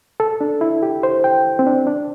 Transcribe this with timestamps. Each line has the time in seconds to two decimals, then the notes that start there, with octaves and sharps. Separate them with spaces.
0.20 A4
0.41 D4
0.61 E4
0.83 G4
1.03 C5
1.24 G5
1.59 C4
1.67 D4
1.87 D4